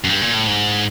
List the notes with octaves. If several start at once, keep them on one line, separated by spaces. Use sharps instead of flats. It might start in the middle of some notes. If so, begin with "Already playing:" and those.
F#2
G2
A#2
A2
G#2